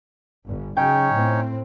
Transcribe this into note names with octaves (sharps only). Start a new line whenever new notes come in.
G1
C#3 F#3 C#4 D#4 C#5 G5
A2 C4